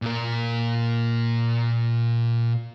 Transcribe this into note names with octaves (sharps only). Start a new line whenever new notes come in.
A#2 A#4